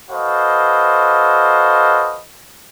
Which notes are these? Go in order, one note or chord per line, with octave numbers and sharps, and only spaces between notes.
F#4 A4 B4 C5 D#5 F5